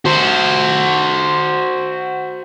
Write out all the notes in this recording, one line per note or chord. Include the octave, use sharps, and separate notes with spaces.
F#4 C5